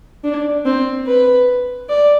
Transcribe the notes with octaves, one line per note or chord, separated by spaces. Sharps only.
D4
C4
B4
D5